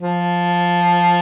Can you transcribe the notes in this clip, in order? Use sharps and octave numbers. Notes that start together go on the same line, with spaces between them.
F3